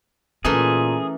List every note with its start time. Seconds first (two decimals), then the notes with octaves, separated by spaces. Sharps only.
0.45 A#2 E3 A3 C#4 G#4 A#4